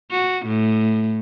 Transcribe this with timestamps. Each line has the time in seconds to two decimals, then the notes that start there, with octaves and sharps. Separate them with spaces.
0.11 F#4
0.46 A2